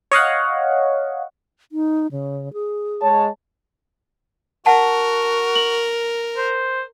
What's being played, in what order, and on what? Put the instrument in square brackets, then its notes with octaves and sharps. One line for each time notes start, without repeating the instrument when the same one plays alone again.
[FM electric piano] C#5 D#5 F5 F#5
[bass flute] D#4
C#3
G#4
[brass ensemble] G#3 C#5 A5
[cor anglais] F#4 [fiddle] A#4 [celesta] F#5 A5
[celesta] F#7
[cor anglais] C5